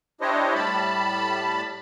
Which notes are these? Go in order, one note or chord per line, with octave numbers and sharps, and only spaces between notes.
D4 E4 G4 C5 C#5 D#5
A2 G3 A5 B5